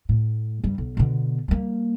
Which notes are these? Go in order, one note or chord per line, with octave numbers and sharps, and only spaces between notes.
A2
G2 G3
B1
B2 D3
G3 A#3